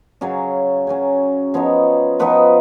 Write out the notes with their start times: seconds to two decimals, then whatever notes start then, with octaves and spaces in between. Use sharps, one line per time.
0.21 C#3 F#3 C#4 F5
0.87 C#3 F#3 C#4
1.54 F3 B3 D#4 C#5
2.19 F3 B3 D#4 B4